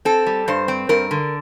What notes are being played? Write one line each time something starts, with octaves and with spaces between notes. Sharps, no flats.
C4 A4
G3
G2 C5
C4
G2 A#4
D3